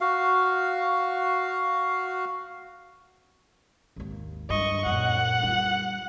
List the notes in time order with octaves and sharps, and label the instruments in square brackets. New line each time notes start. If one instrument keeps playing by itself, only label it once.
[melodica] F#4 F5
[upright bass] G#1 D#2
[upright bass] G2 [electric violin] D#5 C#6
[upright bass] F#2 A#2 [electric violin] F#5
[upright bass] G3 F4